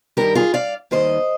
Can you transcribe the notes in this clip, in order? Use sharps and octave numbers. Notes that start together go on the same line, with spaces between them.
G2 D#3 G3 G4 A#4
F4 G#4
D5 F5
D#2 D#3 G3 C5 D#5